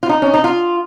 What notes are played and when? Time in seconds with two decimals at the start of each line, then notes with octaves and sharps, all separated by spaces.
0.03 F4
0.09 D#4
0.22 C#4
0.34 D#4
0.44 F4